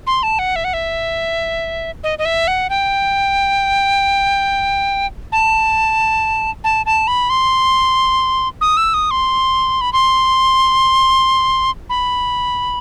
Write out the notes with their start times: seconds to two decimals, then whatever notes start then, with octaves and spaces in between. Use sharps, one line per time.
0.07 C6
0.23 A5
0.39 F#5
0.56 E5
0.64 F#5
0.74 E5
2.04 D#5
2.19 D#5
2.25 E5
2.48 F#5
2.70 G5
5.32 A5
6.64 A5
6.86 A5
7.08 B5
7.30 C6
8.61 D#6
8.77 E6
8.94 D#6
9.11 C6
9.81 B5
9.93 C6
11.90 B5